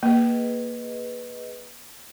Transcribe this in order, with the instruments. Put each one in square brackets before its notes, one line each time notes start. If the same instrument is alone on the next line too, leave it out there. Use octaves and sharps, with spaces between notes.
[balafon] A#3 [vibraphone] G#4 B4 D#5